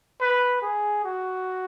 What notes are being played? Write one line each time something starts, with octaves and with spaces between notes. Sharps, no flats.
B4
G#4
F#4